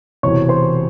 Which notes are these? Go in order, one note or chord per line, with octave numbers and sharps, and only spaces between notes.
E1 E2 C3 C#5 C#6
C5 C6